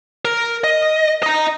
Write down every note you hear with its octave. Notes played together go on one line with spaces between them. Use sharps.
A#4
D#5
D#5 A#5